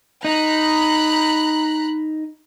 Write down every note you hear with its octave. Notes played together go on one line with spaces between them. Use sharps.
D#4 A#5 B5 F#6